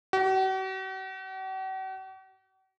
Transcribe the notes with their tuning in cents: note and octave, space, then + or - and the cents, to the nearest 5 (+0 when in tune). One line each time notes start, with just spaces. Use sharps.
F#4 +45